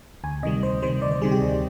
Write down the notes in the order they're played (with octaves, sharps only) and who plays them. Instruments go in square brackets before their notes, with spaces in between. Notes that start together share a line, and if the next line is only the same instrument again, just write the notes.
[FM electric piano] D2 G#5
C3 D#3 G3 D#5
D2 C5
C3 D#3 G3 C5
D2 D5
C5
C3 D#3 G3 G#4
G4
D2